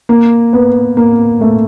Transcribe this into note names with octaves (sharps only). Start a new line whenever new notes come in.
A#3
B3
A#3
A3